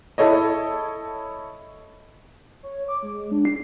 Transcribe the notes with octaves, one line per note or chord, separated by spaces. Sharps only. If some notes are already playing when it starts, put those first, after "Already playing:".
E4 A4 C#5 D#5
C#5
D6
G#3
D4
C7